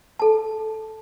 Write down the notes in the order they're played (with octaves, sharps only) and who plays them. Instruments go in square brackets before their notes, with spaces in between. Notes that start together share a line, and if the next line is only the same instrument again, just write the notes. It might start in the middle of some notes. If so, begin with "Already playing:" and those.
[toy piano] A4 A5